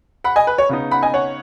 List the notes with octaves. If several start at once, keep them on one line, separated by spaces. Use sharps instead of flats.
F#5 B5
D#5 G#5
B4
C#5
C#3 B3 D#4
F#5 B5
D#5 G#5
C#5 F#5